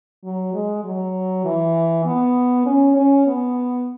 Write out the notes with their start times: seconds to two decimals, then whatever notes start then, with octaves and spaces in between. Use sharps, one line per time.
0.23 F#3
0.54 G#3
0.84 F#3
1.44 E3
2.05 B3
2.66 C#4
2.96 C#4
3.26 B3